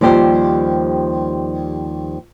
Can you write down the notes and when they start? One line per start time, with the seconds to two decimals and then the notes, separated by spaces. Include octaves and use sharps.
0.01 D#2 F3 G3 G4 A4 C5